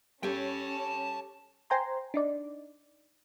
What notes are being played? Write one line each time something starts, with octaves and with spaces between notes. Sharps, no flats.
C#4 G4 A4 C#5 G5 A5
C5 G5 G#5 A#5 C6
D4 D#4 D5